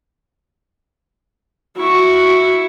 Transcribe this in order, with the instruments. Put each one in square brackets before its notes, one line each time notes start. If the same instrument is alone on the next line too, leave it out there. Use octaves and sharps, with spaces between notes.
[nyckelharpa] E4 C#6 [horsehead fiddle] F#4